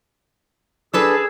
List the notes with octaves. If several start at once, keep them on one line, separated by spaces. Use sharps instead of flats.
D4 G#4 A4 B4 E6